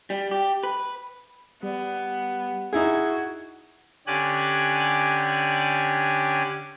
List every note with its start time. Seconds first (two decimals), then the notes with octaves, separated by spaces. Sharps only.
0.10 G3
0.31 G4
0.64 B4
1.63 G3 B3
2.73 D#4 E4 F#4 G#4 G#6
4.07 D3 C#4 G4 D5 G#5 F#6